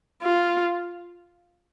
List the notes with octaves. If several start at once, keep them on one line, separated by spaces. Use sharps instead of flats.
F4